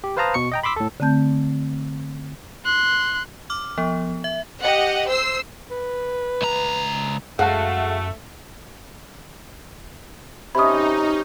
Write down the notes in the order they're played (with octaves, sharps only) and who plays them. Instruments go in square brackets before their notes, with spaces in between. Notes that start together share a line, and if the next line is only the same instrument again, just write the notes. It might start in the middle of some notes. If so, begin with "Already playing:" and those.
[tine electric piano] G4
B4 C5 F5 A5 A#5 D#6
B2 C#6 C#7
D#5 G5 A#5
B5 C6 D6 E6 B6
A2 A4
[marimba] D3 A3 C4 A5 G6
[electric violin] C6 F#6
[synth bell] D6 F6
F3 B3
E5
[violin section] G4 D#5 F#5
C5 E6 C7
[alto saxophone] B4
[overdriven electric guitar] C#2 A#5
[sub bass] F#2 [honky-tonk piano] G#3 F5 A5 [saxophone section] A3 [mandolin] F#4
[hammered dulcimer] C3 C#4 [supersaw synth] D#4 [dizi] G4 [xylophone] B5 D#6